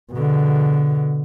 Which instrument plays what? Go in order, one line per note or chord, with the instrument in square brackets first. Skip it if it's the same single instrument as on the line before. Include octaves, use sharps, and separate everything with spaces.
[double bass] B2 D3